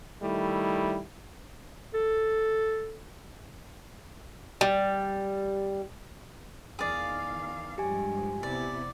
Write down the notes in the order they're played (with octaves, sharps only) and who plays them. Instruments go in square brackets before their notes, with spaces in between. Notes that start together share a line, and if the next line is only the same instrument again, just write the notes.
[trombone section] D#3 G3 A3 E4
[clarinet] A4
[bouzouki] G3
[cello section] E2 D#3 F5 [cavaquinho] G#4 D5
[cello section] G2 F3 G#3 [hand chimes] G4 G#5
[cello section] C3 B3 E4 [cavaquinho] D5